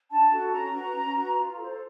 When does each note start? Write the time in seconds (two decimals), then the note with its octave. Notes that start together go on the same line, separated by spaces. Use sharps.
0.10 D4 A5
0.32 F#4 A4
0.52 C#4 A#5
0.74 F#4 B4
0.95 C#4
1.16 F#4 B4
1.37 F4
1.57 A4 C5